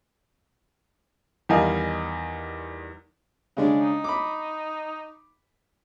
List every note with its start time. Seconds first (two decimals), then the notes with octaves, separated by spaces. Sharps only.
1.49 E2 D#3 G3 D#5 F5 G#5
3.57 C#3 G#3 D4
3.80 D#4
4.04 B5 D6